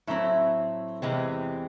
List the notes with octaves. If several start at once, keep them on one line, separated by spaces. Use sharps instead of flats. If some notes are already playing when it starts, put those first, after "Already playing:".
A2 F#3 C4 E4 E5
E2 C3 E3 G#3 C4